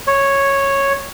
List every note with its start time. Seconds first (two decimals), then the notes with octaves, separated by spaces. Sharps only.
0.07 C#5